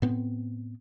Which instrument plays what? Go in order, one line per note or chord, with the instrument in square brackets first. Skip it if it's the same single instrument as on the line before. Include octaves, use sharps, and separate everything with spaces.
[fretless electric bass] A2 B3 C4